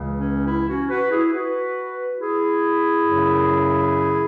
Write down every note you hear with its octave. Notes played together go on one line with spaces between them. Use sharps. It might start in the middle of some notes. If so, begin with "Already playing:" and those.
Already playing: C#2 C#3 E3
C#4
E4
C#4 F#4
F#4 B4
E4 G#4
F#4 B4
E4 G#4
F#2 C#3 F#3